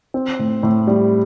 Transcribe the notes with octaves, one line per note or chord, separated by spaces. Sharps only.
C4
A2
A2
G3